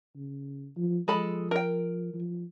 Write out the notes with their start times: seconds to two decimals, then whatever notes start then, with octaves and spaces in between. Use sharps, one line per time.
0.15 C#3
0.77 F3
1.08 F3 G#3 A4 B5
1.51 A#4 G5
2.14 F3